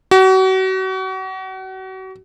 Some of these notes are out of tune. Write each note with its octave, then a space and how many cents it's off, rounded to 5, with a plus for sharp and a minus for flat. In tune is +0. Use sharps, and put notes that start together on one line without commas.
F#4 +35